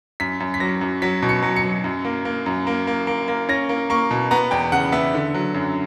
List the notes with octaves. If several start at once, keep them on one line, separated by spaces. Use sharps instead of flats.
F#2 B6
F#2
B6
F#3 A#6
F#2
F#3 B6
B2
C#7
F#3
C#7
F#3
F#2
A#3
A#3
F#2
A#3
A#3
A#3
A#3
C#4 A#6
A#3
A#3 C#6
B2
B3 A#5
E2 G5
C#3 F#5
B3 E5
D3
F#3
F#2